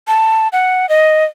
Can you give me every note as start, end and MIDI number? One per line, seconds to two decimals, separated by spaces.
0.08 0.48 81
0.53 0.89 78
0.89 1.25 75